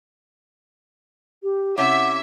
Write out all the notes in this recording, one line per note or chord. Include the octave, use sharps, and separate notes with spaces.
G4
C3 C#4 E4 E5 F#5 D6